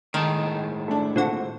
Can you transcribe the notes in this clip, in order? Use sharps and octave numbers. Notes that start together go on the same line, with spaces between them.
A2 D#3 G#3 A5
A3 D4
A#2 D3 C4 F#4